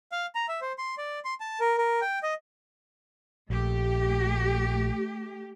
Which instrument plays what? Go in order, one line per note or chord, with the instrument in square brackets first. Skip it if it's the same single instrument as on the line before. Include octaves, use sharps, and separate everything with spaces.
[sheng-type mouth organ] F5
A#5
E5
C5
C6
D5
C6
A5
A#4
A#4
G5
D#5
[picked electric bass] A#1 [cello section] A3 G4